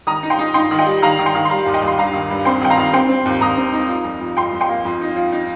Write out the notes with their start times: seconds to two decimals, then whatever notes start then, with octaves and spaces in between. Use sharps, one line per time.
0.07 D#3 A#5 D#6
0.23 D#4
0.30 G5 C6
0.39 D#4
0.54 D#4 G5 C6
0.71 D#3
0.79 D#5 G5
0.86 G3
1.02 D#3 F5 A#5
1.19 D#3
1.26 G5 C6
1.35 D#3
1.45 C6
1.50 G3 F5 A#5
1.66 D#2
1.74 D#5 G5
1.82 D#2
1.88 C6
1.98 G2 F5 A#5
2.13 D#3
2.30 G2
2.45 C4 G5 C6
2.62 D#3 G5
2.70 F5 A#5
2.78 D#3
2.93 C4 G5 C6
3.09 C4
3.25 D#2
3.41 D#2 A#5 D#6
3.57 C4
3.73 D#4
3.89 F3
4.04 F2
4.21 F2
4.37 F2 G5 C6
4.53 F2
4.61 G5 C6
4.69 A#3
4.85 F2
5.01 D#4
5.16 F3
5.32 D#4